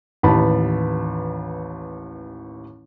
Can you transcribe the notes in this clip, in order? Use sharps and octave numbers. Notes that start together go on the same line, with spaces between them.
A1 D#2 E3 A5 B5